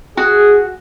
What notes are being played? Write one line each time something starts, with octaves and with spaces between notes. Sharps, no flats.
F#4 G#4